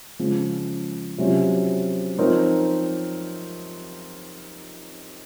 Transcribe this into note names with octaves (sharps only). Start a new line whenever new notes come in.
C#3 F3 G#3
C3 F#3 C#4 F4
F3 C4 D#4 A#4 C#5